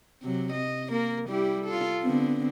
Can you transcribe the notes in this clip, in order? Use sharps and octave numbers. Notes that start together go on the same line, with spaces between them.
C3 F#3
D#5
A#3 A#4
G3 E4 G4
F4 A4
D3 B3 C4